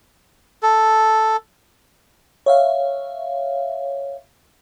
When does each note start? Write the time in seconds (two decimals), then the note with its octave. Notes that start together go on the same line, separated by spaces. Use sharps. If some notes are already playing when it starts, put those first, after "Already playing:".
0.63 A4
2.46 C#5 E5 F5